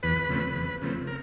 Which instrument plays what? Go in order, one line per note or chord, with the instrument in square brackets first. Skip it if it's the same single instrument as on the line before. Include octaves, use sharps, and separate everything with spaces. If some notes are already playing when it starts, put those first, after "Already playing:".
[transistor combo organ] E2 B4 B5
C#3 F3 A3 C4
E2
C#3 F3 A3 C4
A#4